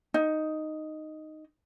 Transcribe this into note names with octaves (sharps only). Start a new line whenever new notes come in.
D#4